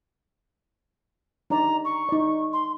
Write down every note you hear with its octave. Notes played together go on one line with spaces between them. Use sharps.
D4 D#4 D5 A#5
C#6
D#4 D5
C6